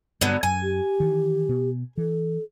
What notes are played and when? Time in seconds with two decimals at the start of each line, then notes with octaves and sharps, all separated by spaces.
0.21 G2 D3 F#3 B3
0.43 F#2 G#5
0.62 G4
1.00 D#3 E3
1.49 B2 B3
1.98 E3 A4